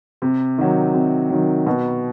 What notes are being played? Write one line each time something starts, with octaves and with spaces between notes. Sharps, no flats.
C3
D#3 F#3
C3
D#3 F#3
B2